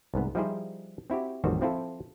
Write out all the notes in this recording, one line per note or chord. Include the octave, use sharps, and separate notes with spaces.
C2 G#2 B3
F3 G3 D#4 E4 G#4 C5
C4 E4 F#4 G4
A1 F2 D#3 G3 F#4 C5
F3 C4 E4 F4 A4